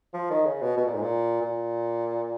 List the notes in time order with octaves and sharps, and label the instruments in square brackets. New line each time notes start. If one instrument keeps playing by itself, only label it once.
[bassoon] F3
D#3
C#3
B2
B2
A#2
G#2
A#2
A#2